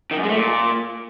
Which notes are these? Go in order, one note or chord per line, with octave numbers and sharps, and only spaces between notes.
D#3
F#2
G#3
A3
A#2